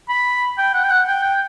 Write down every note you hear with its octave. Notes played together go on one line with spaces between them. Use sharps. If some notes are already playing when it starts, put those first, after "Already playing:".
B5
G5
F#5
G5
F#5
G5
G5